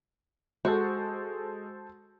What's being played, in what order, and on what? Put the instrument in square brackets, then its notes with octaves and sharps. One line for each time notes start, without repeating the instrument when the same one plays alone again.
[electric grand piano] G#3 [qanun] F#4 [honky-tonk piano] A4 C5